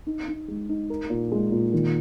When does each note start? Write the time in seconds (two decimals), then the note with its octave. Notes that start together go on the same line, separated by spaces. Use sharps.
0.07 D#4
0.28 D#4
0.48 G#3
0.69 D#4
0.90 A#4
1.10 A#2
1.32 G#3
1.52 A#2
1.73 D#3